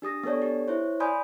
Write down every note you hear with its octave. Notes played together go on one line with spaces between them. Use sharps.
D4 G4 D#6 A#6
B3 D4 A4 C#5 D5
G4
E4 C5 C#5
D5 G#5 B5 C6 D#6 G6